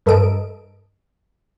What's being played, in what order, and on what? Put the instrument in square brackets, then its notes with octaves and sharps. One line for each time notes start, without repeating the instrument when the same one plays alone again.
[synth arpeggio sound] G2 A4 A#4 D#5 D7